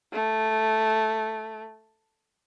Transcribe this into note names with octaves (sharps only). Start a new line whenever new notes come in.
A3